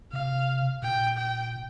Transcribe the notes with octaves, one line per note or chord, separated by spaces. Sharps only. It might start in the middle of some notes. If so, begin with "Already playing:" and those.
C3 F5
A#2 G5
G5